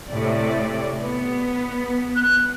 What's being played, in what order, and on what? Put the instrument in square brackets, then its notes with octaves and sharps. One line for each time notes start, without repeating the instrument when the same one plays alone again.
[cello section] A2 C3 D5
B3
[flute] F#6